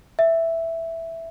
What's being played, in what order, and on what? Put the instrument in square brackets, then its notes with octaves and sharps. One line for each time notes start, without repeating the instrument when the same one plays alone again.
[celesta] E5